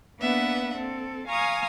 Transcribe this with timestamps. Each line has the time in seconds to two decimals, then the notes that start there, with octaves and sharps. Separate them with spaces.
0.19 A#3 B3 D4 B4 E5 F#5
0.76 C4 A4
1.27 F5 G#5 A#5 C#6 D#6 F6